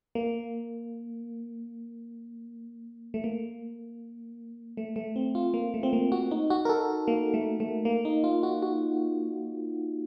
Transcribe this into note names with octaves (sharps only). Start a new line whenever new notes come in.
A#3
A3
A#3
A3
A3
C4
F4
A#3
A3
C4
A#3
F#4
D#4
F#4
A#4
A4
A#3
A3
A3
A#3
D#4
F4
F#4
F#4